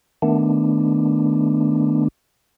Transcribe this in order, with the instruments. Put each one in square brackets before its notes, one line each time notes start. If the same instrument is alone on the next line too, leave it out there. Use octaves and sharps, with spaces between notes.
[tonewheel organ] D#3 A3 B3 D4